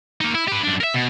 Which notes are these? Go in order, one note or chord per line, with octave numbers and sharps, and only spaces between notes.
A#3 D#4
E4
G4 B4
F#2 D4
A#4 E5
B2